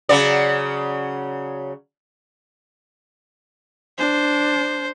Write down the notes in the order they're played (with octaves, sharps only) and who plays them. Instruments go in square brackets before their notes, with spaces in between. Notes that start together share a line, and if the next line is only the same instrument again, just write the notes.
[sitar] C#3 F#3 D5
[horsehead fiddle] D4 [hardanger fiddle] C5